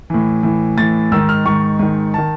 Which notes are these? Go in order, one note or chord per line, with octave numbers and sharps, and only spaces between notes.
A2 E3
A2 E3
A2 E3 A6
G#2 D#3 E6
F6
G#2 D#3 C#6
G#2 D#3
D#3 A5